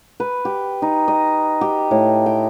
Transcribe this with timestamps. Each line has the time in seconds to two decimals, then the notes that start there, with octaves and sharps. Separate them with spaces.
0.20 B4
0.45 G4
0.82 D#4
1.08 D#5
1.61 G4
1.91 A2
2.26 G5